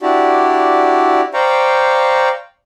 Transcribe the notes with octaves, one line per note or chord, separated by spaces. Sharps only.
D4 E4 F#4 G4 D5
C5 D5 F5 G5 A#5 C#6